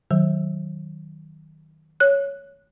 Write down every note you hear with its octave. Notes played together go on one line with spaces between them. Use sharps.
D#3 F#3
C#5 F#6